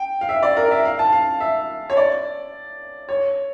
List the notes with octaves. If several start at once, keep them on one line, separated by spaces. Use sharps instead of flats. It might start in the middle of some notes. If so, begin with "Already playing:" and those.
Already playing: G5
F5
E5
D5
A#4
E5
F5
A5
F5
E5
C#5
D5
C#5